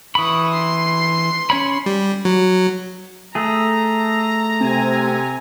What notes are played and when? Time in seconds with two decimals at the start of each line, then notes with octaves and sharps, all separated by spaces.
0.15 E3 B5 C#6 D#6
0.54 C6
1.50 C#4 C#5 B5
1.86 G3
2.25 F#3
3.35 A3 G#4 A#5
4.61 C3 C4 G#5